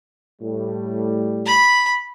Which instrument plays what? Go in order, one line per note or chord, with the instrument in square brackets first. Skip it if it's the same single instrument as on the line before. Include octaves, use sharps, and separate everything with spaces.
[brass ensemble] A2 G3
[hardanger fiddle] B5